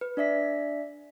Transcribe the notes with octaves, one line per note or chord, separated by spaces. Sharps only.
B4
D4 D5 E5 B6